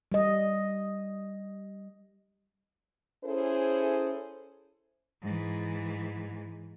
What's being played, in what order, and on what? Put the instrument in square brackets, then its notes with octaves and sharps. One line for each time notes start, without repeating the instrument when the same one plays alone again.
[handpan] G3 D#5
[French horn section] C#4 E4 G#4 A4 C5
[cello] G#2 E3